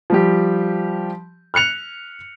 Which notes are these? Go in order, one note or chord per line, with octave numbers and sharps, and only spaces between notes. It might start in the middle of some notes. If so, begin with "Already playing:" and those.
F3 G3 G4
F6 F#6 C#7 F7